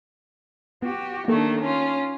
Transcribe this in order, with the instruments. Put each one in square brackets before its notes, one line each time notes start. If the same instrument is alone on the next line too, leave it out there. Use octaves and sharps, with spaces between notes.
[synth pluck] B3 [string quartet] F#4 G4
[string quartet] D#3 A3 D4 [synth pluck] A#3 A4 C#6
[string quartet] C#4 F4